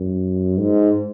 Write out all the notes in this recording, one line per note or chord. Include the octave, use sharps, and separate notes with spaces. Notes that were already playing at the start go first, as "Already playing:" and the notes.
Already playing: F#2
G#2